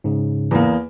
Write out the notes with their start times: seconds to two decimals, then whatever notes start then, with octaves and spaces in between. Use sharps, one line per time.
0.04 G#2 C#3
0.51 E2 A#3